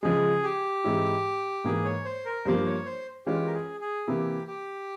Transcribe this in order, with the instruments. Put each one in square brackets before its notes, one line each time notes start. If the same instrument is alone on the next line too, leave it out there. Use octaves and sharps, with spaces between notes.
[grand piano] C#3 F3 G#3 [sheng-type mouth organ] G#4
[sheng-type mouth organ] G4
[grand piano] G#2 E3 G#3 C4 E4
[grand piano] G#2 E3 A#3 [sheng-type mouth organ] G#4
[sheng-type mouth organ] C#5
C5
A#4
[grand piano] G2 F3 A#3 [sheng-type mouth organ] C5
[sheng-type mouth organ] C#5
C5
[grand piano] E3 G#3 C#4 F4 [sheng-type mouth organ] G4
[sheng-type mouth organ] A#4
G#4
G#4
[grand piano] C3 E3 A#3 E4 [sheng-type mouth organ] G4
[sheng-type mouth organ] G4